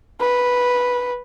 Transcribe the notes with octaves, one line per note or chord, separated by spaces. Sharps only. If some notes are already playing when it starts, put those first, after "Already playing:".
B4